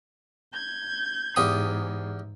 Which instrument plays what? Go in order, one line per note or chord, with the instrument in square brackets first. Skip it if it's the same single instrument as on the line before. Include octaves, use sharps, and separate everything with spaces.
[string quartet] G6 G#6
[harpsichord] E2 G4 D#6 [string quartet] G#2